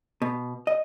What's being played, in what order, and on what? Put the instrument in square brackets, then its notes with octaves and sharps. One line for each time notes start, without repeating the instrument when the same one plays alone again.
[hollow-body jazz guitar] B2
D#5